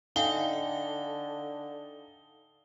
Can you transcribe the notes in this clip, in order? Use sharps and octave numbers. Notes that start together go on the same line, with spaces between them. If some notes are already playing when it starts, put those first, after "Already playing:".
D3 D#4 F5 G5 G#5 G7